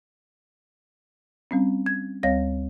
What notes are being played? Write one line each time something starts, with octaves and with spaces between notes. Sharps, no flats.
G3 C4 C#4
G#6
D2 G3 C4 C#5 F5 A#6